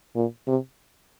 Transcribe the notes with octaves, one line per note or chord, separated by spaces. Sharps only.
A#2
C3